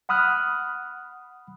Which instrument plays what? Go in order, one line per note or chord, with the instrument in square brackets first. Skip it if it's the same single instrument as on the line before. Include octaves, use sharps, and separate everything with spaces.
[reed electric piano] F#5 B5 D#6 F6 F#6